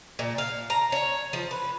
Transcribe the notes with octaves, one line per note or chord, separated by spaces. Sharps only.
A#2
F5
A#5
C#5
F3
B4